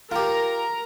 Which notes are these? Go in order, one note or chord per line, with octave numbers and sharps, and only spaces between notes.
F4 G4 A#4 A#5